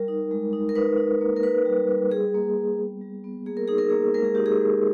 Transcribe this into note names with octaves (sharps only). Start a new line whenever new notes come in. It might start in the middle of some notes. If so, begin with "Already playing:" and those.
Already playing: G3 A#4
D#4
G#3
D#4
A#4
D#4 B4
D#4
A#3
A#4
D#4 B4
G3
G3
G3 G#4
A#3
G3
B3
G3
B3
A#3 G#4
A#4
D#4 G#4
A#4
A#3 G#4
G#3 A#4
G#4
D#4 G4
G#4
G#3